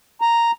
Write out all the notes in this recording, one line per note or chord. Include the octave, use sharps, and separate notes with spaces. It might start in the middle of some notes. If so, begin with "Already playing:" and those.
A#5